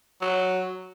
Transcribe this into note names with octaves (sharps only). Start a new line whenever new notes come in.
F#3